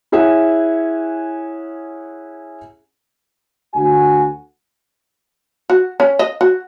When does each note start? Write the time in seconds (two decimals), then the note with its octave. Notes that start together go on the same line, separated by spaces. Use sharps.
0.12 C#4 E4 G#4 E5 F#5 G#5
3.74 D2 F#4 G#5
5.70 F#4
6.00 C#4
6.19 D#5
6.41 F#4